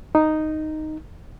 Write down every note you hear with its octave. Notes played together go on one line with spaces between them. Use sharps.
D#4